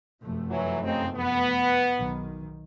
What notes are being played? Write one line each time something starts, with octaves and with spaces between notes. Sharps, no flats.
F1 F#2 A3
E3 F#3
C#3 C4 D#4
B3
B1 D#3